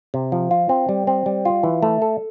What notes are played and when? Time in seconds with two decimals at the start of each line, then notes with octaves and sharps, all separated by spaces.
0.14 C3
0.32 F3
0.51 F4
0.69 C4
0.89 G3
1.07 C4
1.26 G3
1.45 F4
1.63 E3
1.82 A3
2.02 A4